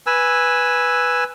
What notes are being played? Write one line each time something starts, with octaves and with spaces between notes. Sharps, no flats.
B4 G#5 E6